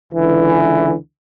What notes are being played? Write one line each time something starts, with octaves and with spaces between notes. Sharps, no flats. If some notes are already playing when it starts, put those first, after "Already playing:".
C#2 D3 E3